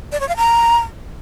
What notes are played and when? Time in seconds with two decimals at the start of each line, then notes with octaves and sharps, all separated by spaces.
0.12 D5
0.20 C#5
0.29 F5
0.37 A#5